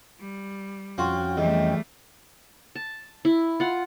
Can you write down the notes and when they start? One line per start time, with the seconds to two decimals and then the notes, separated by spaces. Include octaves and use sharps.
0.20 G3
0.98 F2 C#4 F4 F#4 G5
1.37 E2 G3 A3 D#5
2.75 A5
3.25 E4
3.60 F4 F#5